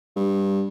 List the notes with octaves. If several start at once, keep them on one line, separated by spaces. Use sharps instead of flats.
G2